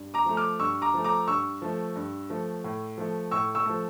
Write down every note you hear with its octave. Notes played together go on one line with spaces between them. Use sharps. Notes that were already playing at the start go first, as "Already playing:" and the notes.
Already playing: G2
A#5 D6
F3 A3
D6 F6
G2 C#6 E6
A#5 D6
F3 A3
A#5 D6
G2 C#6 E6
F3 A3
G2
F3 A3
A2
F3 A3
A2 C#6 E6
C#6 E6
F3 A3